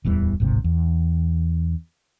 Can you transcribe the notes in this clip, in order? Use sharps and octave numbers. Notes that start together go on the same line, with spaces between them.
D1 E2 E3 G3
D1 G#1 G#2 C3
E2